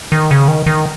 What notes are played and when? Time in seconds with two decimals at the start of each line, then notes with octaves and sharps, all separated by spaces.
0.12 D#3
0.31 C#3
0.48 D#3
0.66 D#3